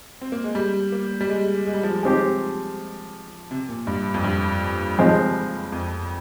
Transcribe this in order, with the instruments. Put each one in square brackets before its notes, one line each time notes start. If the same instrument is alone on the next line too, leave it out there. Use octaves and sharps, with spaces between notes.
[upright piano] C4
A#3
G#3
G3
A#3
G3
G#3
G#3
G3
F3
G3
[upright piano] F3 [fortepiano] G#3 C4 G4
[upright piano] C3
A#2
G2
F2
G2
[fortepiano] F3 G#3 C4
[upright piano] F2